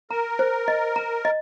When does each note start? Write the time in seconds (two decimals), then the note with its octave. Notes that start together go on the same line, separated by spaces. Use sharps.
0.11 A#4 A#5
0.39 C5
0.68 D#5
0.96 A#5
1.25 D#5